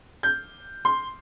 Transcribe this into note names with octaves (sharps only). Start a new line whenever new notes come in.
G6
C6